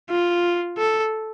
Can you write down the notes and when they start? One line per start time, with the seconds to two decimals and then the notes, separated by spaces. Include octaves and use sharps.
0.10 F4
0.78 A4